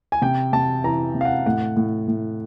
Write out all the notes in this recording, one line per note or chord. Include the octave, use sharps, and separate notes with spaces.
G#5
C3 G5
C3 A5
E3 A#5
C3
F5
F#5
A2 F#5
A2
A2